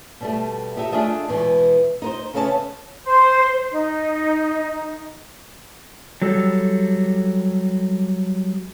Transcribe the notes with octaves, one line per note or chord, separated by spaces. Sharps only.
B2 G3 A3
D#4 G4 A4 E5
A3 D4 F4 G#4 D#5 E5
E2 B2 E3 G#3
D#4 B4 C5
C#3 A3 B3 C#4 E4 A5
C5
D#4
F#3 G3 A4